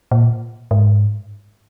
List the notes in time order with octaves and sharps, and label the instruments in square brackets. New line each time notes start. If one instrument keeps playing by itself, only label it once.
[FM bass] A#2
G#2